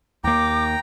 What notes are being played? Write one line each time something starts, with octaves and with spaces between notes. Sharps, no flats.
D#2 A#3 G5 A#5 D6